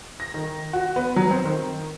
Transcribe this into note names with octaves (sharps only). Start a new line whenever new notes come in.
A#6
D#3
F#4
B3
F#3
C4
D#3